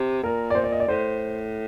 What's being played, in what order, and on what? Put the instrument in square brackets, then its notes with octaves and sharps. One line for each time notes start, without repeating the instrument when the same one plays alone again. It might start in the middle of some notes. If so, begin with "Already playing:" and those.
Already playing: [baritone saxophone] C3
[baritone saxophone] A#2 [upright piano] A#4
[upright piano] D5
C5
D5
D#5
D5
[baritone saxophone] A2 [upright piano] C5